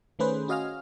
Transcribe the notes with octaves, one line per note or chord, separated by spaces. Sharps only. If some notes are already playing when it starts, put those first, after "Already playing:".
D#3 A3 C#4 G#4 B4 C5
C#4 F#4 D#5 F5 G#5 F6